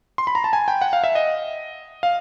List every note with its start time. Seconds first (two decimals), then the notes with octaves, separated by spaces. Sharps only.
0.18 C6
0.27 B5
0.35 A#5
0.44 A5
0.53 G#5
0.68 G5
0.82 F#5
0.93 F5
1.04 E5
1.15 D#5
2.03 F5